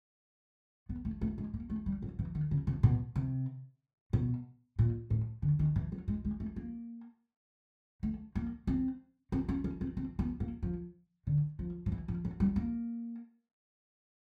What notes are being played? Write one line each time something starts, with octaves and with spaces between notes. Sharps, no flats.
B3
A3
A3
G#3
A#3
A3
G3
F#3
E3
D#3
C#3
C3
B2
C3
B2
A#2
A2
D3
D#3
E3
F#3
G#3
G#3
A3
A#3
A3
A#3
C4
C4
C#4
C#4
C4
C4
B3
A#3
F3
D3
F3
F3
E3
F3
F#3
G3
A#3